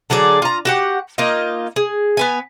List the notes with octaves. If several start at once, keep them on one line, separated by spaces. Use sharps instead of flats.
D3 F#3 G#4 D5
F4 A#5
F#4 G4 F#5
A#3 D#4 F4 D#5
G#4
B3 B4 G#5